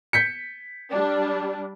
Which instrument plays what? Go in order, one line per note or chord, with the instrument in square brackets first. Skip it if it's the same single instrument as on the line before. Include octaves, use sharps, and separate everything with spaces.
[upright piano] G6 B6 C#7
[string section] G3 D4